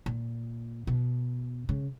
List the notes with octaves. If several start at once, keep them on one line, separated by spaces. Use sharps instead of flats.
A#2
B2
C#3